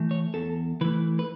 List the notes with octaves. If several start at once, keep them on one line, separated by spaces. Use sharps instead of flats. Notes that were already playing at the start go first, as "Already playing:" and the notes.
Already playing: E3 A3
C#5
E2 A4
E3 A3 B4
B4